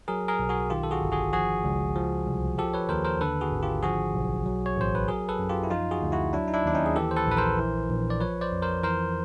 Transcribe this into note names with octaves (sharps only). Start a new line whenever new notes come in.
F#3 G#4 A#4
G#4 A#4
B1
F#4 G#4
D#3 F4 G4
A4
F#4 G#4
G1
F#4 G#4
F3 F#4 G#4
C#2
F3
C2
F3 G4 A4
B4 C#5
D#2 A#4 C5
A#4 C5
D3 A4 B4
F#4 G#4
G#1
F4 G4
F3 F#4 G#4
B1
F#3
C#5
A1 C5
B4
F#3 G#4 A#4
A4 B4
F#2
F4 G4
E4
F3 D#4 F4
F#4 G#4
D2
E4 F#4
F#3 D4 E4
D#4
D4 E4
D#2 D4
C#4 D#4
G#4
E3 G4 A4
C5
A4 B4
A#1 B4
A#4 C5
E3
A#1
D5
F3 B4 C#5
C5 D5
F2
A#4 C5
E3 A#4 C5